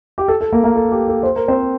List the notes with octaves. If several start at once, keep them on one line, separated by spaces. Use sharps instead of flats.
G4
A4
A4
A#3 A#4
A#3 A#4
A4
G4
A4
C5
A#4
C4 C5